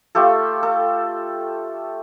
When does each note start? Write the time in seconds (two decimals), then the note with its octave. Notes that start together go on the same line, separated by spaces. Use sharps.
0.15 A3 F4 G4 A4
0.63 A4